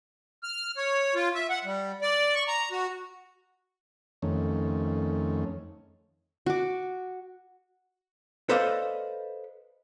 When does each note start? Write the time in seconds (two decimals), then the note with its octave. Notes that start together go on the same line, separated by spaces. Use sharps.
0.43 F6
0.77 C#5
1.15 F4
1.34 E5
1.50 F#5
1.64 G3
2.02 D5
2.35 C#6
2.48 A#5
2.71 F#4
4.22 F2 D#3 A3 C#4
6.46 F#4 D6
8.49 A4 B4 C5 D5 D#5 F5